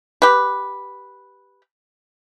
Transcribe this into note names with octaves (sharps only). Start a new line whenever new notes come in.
G4 B4